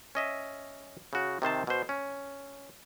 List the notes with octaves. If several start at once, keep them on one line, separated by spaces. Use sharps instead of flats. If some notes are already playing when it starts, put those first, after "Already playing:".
C#4 D#5 E5
C#3 F#4
C3 D#3 C5 A5
B2 C5
C#4